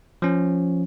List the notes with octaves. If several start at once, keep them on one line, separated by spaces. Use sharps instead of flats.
F3 C#4